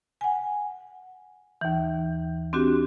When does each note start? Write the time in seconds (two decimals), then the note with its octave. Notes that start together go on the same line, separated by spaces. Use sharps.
0.21 F#5 G#5
1.61 D#2 E3
2.53 C4 D4 F#4 G4